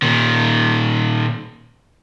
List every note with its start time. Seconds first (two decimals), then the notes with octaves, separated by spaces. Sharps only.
0.02 A#2 D#3